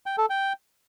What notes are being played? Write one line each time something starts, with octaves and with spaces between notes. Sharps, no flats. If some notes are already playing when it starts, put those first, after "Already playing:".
G5
A4
G5